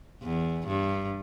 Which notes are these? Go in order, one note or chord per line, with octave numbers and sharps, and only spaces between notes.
E2
G2